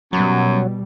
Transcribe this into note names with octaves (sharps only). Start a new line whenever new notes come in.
F#2 B2 F#3 G3